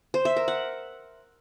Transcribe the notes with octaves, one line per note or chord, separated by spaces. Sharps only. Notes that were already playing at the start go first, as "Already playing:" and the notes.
C5
E5
A#4
F#5